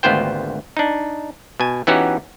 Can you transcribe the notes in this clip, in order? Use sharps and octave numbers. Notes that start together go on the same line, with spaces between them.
G#1 D2 B3 F4 C5 G5
D4 D#4
B2 G#5
E3 B3 C#4 D#4 F#4 G4